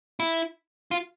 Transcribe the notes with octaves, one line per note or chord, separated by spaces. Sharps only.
E4
F4